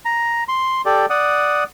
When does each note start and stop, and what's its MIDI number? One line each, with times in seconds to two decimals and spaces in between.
0.05 0.44 82
0.48 0.82 84
0.86 1.06 67
0.86 1.06 69
0.86 1.06 74
1.10 1.64 74
1.10 1.64 78
1.10 1.64 87